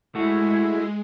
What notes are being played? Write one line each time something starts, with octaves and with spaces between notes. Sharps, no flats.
G#3 A3 E4 F#4